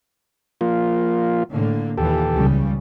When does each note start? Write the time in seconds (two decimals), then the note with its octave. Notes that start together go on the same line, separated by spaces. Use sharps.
0.61 F3 A#3 F4
1.50 A2 D3 A#3
1.97 D#2 A#2 E3 G4 A4
2.34 C#2 C#3 G3